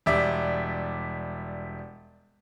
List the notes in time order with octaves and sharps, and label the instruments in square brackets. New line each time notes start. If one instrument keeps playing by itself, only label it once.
[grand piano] E1 G3 D5 E5